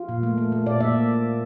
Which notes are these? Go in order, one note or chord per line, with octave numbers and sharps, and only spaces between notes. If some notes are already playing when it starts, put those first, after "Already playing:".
Already playing: F4
A#2
A3
A3
A3
A#2 D5
A#2 E5